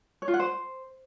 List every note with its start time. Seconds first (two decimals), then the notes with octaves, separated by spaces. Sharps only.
0.22 C#5
0.28 F4
0.34 F#5
0.40 C5